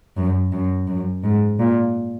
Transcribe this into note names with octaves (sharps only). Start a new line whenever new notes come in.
F#2
F#2
F#2
G#2
A#2